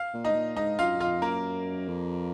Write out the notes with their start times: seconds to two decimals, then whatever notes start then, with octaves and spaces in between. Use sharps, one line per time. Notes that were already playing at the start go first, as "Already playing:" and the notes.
Already playing: F5
0.14 A#2
0.25 D#4 D#5
0.30 G#2
0.35 A#2
0.57 G#2 D#4 D#5
0.79 F#2 F4 F5
1.00 F2 F4 F5
1.22 F#2 A#3 A#4
1.88 F2